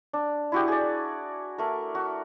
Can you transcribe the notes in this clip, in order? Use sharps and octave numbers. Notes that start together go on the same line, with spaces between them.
D4
E4 F#4 G4
G#4 D5
A3 A#4
F#4